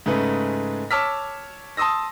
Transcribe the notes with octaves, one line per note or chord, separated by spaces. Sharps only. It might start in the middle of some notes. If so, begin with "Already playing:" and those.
G#2 C#3 A3 B4
C#5 A5 D6 E6 F6 B6
A5 C6 D#6 E6 A#6